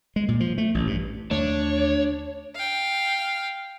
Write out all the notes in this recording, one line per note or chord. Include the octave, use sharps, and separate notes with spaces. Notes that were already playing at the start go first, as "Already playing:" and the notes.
G#3
A#2
F3
A3
A1
G2
D#2 D3 A3 D4 C#5
F5 G5